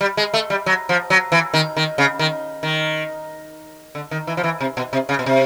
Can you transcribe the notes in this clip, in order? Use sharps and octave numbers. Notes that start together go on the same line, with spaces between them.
G3
G#3
A3
G3
F#3
F3
F#3
E3
D#3
D#3
C#3
D#3
D#3
D3
D#3
E3
F3
E3
C3
B2
C3
C#3
B2
C3